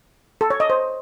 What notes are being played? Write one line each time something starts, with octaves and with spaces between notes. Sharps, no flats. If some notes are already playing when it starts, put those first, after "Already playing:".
A4
C#5
D#5
C5